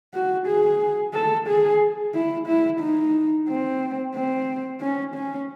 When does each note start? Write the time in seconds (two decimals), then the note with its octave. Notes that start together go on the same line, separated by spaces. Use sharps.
0.14 F#4
0.47 G#4
1.14 A4
1.48 G#4
2.15 E4
2.47 E4
2.80 D#4
3.48 C4
4.15 C4
4.81 C#4
5.15 C#4